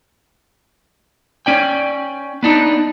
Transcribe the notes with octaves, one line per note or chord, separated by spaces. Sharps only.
C#4 D5 G5
B3 D4 D#4